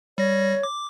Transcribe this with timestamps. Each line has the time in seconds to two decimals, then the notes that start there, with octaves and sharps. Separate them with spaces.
0.18 G3 C#5 A#6
0.63 D6